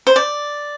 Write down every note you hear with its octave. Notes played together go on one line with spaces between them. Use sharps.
C5
D5